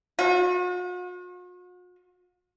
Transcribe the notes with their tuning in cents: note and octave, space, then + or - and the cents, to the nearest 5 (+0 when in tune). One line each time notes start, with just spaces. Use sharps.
F#4 -45